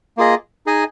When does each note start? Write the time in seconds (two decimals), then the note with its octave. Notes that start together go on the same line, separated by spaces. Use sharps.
0.17 A#3 F4 G#4 D#5
0.66 D#4 G#4 D#5 G#5